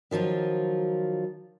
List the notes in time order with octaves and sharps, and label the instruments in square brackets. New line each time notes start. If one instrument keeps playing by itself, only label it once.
[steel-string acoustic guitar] D#3 F3 F#3 F4